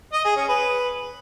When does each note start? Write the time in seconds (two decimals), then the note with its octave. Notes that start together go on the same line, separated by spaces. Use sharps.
0.13 D#5
0.25 G#4
0.36 C#4
0.48 B4